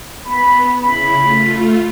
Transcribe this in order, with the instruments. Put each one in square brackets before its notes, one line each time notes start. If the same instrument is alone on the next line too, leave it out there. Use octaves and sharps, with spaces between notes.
[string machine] B3 [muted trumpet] B5
[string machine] C#3 E4 [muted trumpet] B5
[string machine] A3 F4